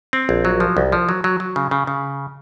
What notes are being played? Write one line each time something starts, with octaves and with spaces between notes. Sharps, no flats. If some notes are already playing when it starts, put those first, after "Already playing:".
C4
A#1
F#3
F3
C2
F3
F#3
F#3
F#3
C#3
C#3
C#3